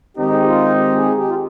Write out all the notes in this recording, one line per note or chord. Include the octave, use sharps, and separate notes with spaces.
D#3 G#3 C4 D#4 G4
G#4
G4
F4
G4
G#4
G4
F4